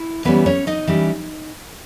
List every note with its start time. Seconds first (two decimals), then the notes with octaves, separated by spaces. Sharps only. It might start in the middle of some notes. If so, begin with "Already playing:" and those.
Already playing: E4
0.25 E3 G3 B3 C#4 B4
0.46 C#4 C#5
0.67 D#4 D#5
0.87 E3 G3 C#4